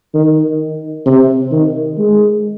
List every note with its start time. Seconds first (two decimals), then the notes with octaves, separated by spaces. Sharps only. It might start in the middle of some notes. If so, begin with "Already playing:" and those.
0.14 D#3
1.06 C3
1.52 D#3
1.98 G#3